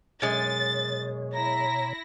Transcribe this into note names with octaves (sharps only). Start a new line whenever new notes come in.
F#2 B2 G#3 C#5 A6
E4 A#5 A#6